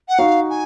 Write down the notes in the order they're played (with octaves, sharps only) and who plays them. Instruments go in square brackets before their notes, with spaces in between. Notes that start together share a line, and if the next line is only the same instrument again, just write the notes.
[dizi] F#5
[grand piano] D#4 F#4 [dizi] F5
[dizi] G#5